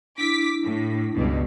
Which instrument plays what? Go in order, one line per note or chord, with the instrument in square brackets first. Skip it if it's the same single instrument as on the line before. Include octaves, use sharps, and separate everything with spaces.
[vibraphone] D4 E4 [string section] D6 B6
[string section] A2
C#2 G2 B2